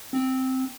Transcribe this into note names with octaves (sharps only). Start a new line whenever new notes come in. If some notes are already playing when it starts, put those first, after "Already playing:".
C4